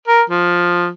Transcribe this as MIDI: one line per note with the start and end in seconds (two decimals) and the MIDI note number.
0.08 0.22 70
0.30 0.88 53